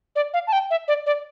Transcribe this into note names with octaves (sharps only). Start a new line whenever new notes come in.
D5
F5
A5
G5
E5
D5
D5